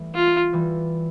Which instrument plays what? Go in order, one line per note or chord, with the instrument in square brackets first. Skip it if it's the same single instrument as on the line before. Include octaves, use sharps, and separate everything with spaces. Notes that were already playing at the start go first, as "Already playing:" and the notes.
Already playing: [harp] E3 G3 A3
[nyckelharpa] F4
[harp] E3 G3